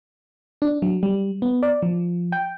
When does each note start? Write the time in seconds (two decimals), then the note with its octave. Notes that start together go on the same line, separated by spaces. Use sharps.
0.62 D4
0.82 F#3
1.03 G3
1.42 B3
1.63 D5
1.82 F3
2.32 G5